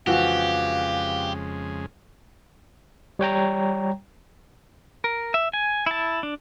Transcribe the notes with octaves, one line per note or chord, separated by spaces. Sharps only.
F2 C#3 E3 F3 G#3 F#4 G4 F5
G3 C#5 G5 A#5
A#4
E5
G#5
E4 A5
D4